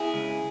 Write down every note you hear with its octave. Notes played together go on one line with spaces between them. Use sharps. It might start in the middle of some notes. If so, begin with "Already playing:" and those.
Already playing: E4 G#4
C#2